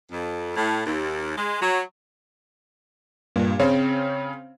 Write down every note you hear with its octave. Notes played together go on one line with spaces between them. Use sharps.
F2
A2
D#2
G#3
F#3
G2 A#2
C#3 C4 C#4